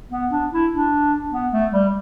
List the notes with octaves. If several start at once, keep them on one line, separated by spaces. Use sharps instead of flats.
B3
D4
E4
D4
B3
A3
G3